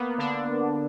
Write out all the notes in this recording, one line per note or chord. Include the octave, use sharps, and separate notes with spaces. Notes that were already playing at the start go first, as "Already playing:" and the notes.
Already playing: A#3 B3
D3 D4